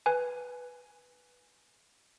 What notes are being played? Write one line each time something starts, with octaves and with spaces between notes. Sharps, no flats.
B4 G#5